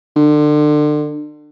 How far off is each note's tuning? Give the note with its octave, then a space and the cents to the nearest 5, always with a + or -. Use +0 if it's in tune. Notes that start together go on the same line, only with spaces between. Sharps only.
D3 +30